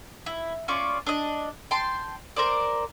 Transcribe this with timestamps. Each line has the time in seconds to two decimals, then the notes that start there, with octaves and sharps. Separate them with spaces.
0.26 E4
0.68 C#4 F4 D5 C#6
1.07 D4 D#5
1.71 G5 A5 C6
2.36 A#4 C5 D5